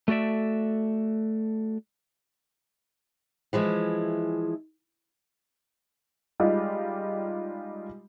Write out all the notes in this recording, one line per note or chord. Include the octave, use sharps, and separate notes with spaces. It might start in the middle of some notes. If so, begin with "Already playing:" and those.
A3 F#4 A4 D5 E5
E3 F3 G#3 E4
G3 G#3 D#4 F4 G4